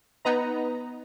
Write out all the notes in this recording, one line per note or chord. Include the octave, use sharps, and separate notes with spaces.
B3 D#4 B4 D#5 A#5